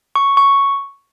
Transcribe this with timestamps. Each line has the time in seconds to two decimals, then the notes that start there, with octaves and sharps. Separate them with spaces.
0.16 C#6
0.37 C#6